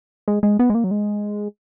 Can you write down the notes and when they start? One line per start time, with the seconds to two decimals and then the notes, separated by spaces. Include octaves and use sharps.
0.28 G#3
0.43 G#3
0.59 B3
0.70 G#3
0.75 A#3
0.84 F#3
0.91 G#3